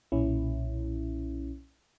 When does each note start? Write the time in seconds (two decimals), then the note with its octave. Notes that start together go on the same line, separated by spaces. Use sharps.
0.12 B1 A#2 C#4 E4